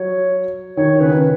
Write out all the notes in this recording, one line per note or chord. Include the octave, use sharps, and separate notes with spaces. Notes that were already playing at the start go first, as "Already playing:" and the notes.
Already playing: F#3 C#5
D#3 C#5
C#3 B4
D#3